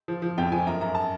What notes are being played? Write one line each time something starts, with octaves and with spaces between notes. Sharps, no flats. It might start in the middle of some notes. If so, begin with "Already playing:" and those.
F3
F3
F2 G5
F3 G#5
F#2 A#5
F#2 A#5
A5